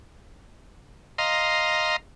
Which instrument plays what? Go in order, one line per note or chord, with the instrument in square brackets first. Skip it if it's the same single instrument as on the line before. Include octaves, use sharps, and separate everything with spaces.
[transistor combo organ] D#5 F5 A#5 C6